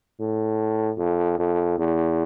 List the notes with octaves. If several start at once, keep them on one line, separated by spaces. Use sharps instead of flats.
A2
F2
F2
E2